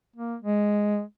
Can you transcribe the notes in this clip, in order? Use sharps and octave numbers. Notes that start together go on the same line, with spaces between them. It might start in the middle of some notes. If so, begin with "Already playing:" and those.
A#3
G#3